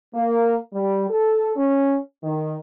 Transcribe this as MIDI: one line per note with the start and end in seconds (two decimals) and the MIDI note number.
0.15 0.56 58
0.74 1.06 55
1.10 1.56 69
1.56 1.98 61
2.24 2.55 51